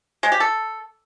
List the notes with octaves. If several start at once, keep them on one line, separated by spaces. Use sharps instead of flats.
G#3
G4
A4